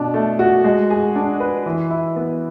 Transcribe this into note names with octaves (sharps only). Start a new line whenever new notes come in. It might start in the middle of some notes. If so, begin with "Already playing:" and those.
Already playing: B2 D4
A3
F#4
G#3
G#4
D4
B4
E3
E4
B3